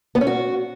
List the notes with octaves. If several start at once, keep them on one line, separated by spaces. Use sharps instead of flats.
B3
C#4
F#4